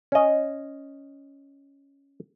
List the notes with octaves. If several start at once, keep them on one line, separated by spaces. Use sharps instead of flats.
C#4 D#5